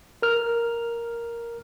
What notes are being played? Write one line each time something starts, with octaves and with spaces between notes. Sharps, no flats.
A#4 F6